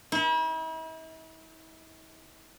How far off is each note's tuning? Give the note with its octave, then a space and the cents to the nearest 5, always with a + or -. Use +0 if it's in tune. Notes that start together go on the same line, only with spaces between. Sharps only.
E4 -45